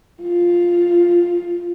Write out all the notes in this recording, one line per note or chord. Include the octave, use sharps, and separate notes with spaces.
F4